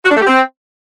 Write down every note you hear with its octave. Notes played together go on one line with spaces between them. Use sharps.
F#4
D4
A3
G4
C4